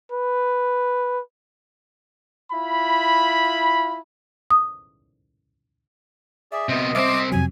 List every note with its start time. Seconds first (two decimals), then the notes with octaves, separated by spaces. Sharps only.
0.12 B4
2.52 E4 F4 B5
4.50 D#6
6.52 G#4 D5 E5
6.69 C3 B3 D#5
6.95 C2 C4 C5 E5 D6
7.19 B6
7.32 F2 C3 F#3 G#5